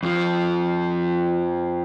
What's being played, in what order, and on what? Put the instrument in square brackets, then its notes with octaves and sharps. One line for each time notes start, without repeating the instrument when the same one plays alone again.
[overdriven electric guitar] F2 F3